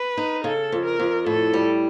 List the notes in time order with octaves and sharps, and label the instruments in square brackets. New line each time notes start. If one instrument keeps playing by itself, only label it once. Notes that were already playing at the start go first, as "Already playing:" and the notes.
Already playing: [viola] B4
[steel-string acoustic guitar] D#4
[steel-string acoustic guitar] C#3 [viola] A4
[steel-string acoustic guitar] F2
[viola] A#4
[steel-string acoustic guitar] F2
[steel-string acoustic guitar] A2 [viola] A4
[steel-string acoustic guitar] G3